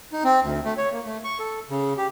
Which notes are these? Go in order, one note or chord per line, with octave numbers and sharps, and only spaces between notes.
D#4
C4
D2
A3
C#5
A#3
A3
C#6
A4
C#3
G4